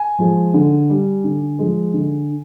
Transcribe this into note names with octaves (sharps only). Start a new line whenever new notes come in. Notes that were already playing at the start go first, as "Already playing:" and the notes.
Already playing: G#5
F3 G#3
D3
G3
D3
F3 G#3
D3